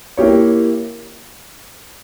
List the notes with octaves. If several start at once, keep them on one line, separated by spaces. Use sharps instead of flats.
A#3 E4 G4 C#5